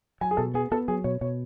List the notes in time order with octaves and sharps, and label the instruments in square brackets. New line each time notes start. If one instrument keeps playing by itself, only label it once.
[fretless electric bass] F#3 [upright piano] G#5
[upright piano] G#4
[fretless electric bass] B2 [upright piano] A4
[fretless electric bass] B3 [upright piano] G#4
[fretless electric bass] B3 [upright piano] A4
[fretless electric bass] F#3 [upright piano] G#4
[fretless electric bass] B2 [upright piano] C#5
[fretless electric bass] B2 [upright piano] C#5